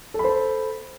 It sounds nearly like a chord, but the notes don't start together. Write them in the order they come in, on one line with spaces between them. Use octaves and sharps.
A4 B5 C5